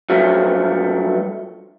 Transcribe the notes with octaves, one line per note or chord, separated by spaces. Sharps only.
G2 F3 F#3 A3